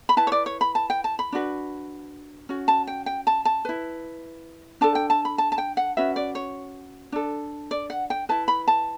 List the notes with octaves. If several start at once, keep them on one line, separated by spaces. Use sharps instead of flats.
B5
E4 B4 A5
C#5
D5
C#5
B5
A5
G5
A5
B5
D4 F#4 B4
C#4 F#4
A5
G5
G5
A5
A5
E4 B4
D4 A4 A5
G5
A5
B5
A5
A5
G5
F#5
C#4 F#4 B4 E5
D5
C#5
D4 A4
D5
F#5
G5
E4 B4 A5
B5
A5